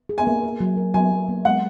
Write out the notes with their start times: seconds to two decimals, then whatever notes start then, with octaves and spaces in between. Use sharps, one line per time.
0.09 G#4
0.18 G#5
0.27 A#3
0.43 A#4
0.60 F#3
0.77 A#4
0.94 F#3 G#5
1.12 F#3
1.29 A#3
1.45 G#3 F#5